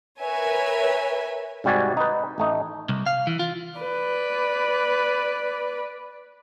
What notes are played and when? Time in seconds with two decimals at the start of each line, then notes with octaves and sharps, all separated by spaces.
0.21 A#4 B4 C#5 E5 G#5
1.64 G#2 C3 G3 F#4 D5 G#5
1.97 D#4 B4
2.38 A1 A3 D#4
2.89 C2
3.06 F5
3.27 E3
3.39 F4
3.79 B4 D5